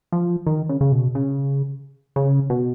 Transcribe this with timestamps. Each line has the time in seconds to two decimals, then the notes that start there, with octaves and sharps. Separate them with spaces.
0.12 F3
0.46 D#3
0.69 C#3
0.81 C#3
0.92 B2
1.15 C#3
2.16 C#3
2.50 B2